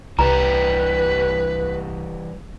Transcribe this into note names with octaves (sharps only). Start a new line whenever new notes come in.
C2 E3 G3 G4 B4 A#5